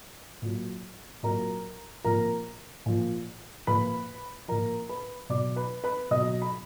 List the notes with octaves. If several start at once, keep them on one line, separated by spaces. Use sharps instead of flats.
A#2 F#3
A#2 F#3 A#4 A#5
A#2 F3 A#4 A#5
A#2 F3
A#2 F3 B4 B5
A#2 F3 A#4 A#5
B4 B5
B2 F#3 D5 D6
B4 B5
B4 B5
B2 F#3 D#5 D#6
B5